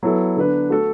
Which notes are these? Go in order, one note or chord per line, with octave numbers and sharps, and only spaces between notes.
F#3 B3 E4 A4
D3 B3 D4 B4
A3 F#4 A4